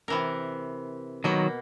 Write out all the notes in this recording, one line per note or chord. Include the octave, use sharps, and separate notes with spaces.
C3 E3 A#4
B2 D#3 F#3 A#3